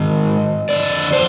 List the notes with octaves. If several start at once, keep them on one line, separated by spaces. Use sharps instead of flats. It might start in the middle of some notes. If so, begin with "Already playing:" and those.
Already playing: G#2 D#3 G#3 D#5
F2 D3 F3 D5
C5